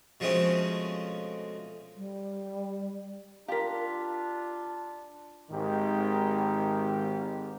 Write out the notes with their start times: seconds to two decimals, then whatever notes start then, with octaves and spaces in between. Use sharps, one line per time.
0.20 B2 F3 G#3 A3 C4 C#4
1.97 G3
3.48 D4 F4 G4 A#4 F5 B6
5.51 G#1 G#2 D#3 D#4 G4